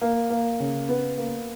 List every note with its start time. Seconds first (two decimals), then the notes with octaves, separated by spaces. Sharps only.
0.01 A#3
0.30 A#3
0.60 C#3
0.89 B3
1.18 A#3